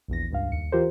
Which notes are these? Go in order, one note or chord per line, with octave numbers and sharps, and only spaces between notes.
A#1 E2 A#6
C#2 G2 F5
D#2 C#7
E3 F4 G4 A#4 C5